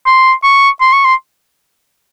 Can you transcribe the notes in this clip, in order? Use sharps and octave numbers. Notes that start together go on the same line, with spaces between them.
C6
C#6
C6
C#6
C6